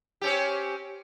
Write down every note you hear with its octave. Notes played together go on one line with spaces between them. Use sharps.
C4 C#4 G4